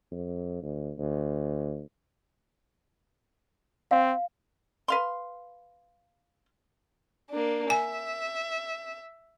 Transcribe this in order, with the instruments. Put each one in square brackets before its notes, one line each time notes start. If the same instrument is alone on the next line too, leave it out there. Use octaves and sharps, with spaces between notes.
[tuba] F2
D2
D2
[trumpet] C4 [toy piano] F5
[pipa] B4 F5 C6
[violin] A#3 D4
[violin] E5 [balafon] G#5